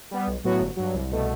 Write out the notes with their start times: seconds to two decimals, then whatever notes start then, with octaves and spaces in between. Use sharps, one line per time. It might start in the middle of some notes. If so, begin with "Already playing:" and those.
0.11 G3 B3
0.27 B1
0.44 A2 F#3 B3 F#4
0.60 G1
0.77 G2 F#3
0.94 C2
1.11 B2 A3